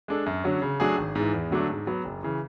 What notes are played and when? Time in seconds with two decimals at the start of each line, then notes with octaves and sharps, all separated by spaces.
0.08 G#3 D4 A4
0.26 F#2
0.44 D3 F#3 C#4
0.62 C#3
0.80 F#3 A3 D4 G#4
0.98 G#1
1.15 G#2 E3
1.34 E2
1.51 D3 F#3 A3 D4
1.70 G#2
1.87 F#3 B3
2.05 F#1
2.23 C#3 E3